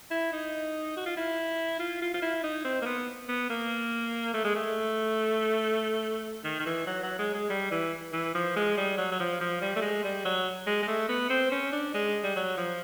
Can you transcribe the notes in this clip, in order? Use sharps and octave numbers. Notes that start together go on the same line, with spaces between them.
E4
D#4
F#4
F4
E4
F4
F4
F4
E4
D#4
C4
A#3
B3
B3
A#3
A3
G#3
A3
D#3
D#3
E3
F#3
F#3
G#3
G#3
G3
E3
E3
F3
G#3
G3
F#3
F#3
F3
F3
G3
A3
G#3
G3
F#3
G#3
G#3
A3
B3
C4
C#4
D4
G#3
G3
F#3
F3